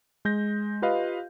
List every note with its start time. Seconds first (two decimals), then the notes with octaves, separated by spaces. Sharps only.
0.25 G#3 G6 A#6
0.82 F4 G4 B4 D#5 F5